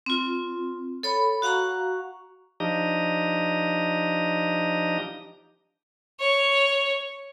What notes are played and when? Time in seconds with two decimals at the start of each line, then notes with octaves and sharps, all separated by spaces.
0.06 C4 F4
1.03 A4 C#5 B5
1.42 F#4 F5 F#5 A#5 C#6
2.60 F3 D4 D#4 G4 D#5 A#5
6.20 C#5